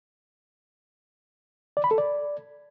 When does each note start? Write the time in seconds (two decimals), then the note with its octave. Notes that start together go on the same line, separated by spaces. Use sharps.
1.77 D5
1.84 B5
1.91 A4
1.98 D5